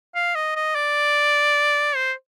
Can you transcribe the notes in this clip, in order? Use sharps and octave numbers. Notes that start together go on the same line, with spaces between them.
F5
D#5
D#5
D5
C5